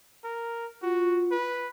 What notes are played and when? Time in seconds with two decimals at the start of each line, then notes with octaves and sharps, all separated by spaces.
0.24 A#4
0.82 F4 F#4
1.31 B4